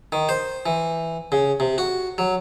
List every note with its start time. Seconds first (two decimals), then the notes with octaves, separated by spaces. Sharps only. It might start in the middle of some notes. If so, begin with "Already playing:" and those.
0.12 D#3
0.29 C5
0.66 E3
1.32 C#3
1.60 C3
1.78 F#4
2.18 F#3